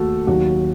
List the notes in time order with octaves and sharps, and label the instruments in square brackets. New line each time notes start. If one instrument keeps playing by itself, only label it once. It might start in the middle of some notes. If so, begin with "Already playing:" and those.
Already playing: [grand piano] D#2 A3 F#4 A4
D#2 D#3 F#3 F#4